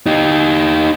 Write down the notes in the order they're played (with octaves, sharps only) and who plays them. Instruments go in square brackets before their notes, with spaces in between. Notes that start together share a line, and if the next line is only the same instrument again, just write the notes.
[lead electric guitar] D#4 G4